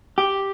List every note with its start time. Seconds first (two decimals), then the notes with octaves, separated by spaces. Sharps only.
0.18 G4